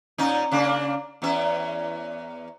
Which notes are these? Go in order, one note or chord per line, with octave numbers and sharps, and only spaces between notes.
A#2 C#4 D#4
C#3 A#3 D4
E2 C#4 E5